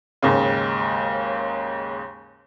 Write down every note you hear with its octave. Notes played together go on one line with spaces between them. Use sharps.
D#2 G#2 C#3